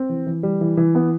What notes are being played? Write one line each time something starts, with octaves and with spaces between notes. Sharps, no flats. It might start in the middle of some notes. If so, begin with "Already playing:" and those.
Already playing: C4
E3
E3
G3
E3
E3
B3